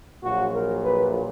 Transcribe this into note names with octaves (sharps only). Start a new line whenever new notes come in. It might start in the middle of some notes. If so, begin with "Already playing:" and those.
A#1 A#2 F#3 F#4
A#4
B4